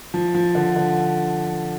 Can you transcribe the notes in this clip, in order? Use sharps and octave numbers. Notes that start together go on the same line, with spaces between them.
F3
F3
D3
D3